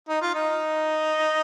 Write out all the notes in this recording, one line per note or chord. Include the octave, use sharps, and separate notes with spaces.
D#4
F4
D#4